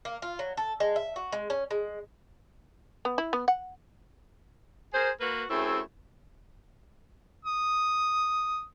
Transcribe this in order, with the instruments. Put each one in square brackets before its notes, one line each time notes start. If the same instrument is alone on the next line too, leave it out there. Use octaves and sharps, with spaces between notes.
[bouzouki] A#3
F4
F#3
A4
G#3
E5
F#4
G#3
C#4
G#3
[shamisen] B3
E4
B3
F#5
[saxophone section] G#4 A#4 C5
A#3 F#4 B4
F#2 A3 C4 E4 G#4
[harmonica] D#6